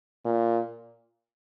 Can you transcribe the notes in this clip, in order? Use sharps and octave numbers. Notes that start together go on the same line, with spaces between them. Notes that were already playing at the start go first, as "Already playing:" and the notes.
A#2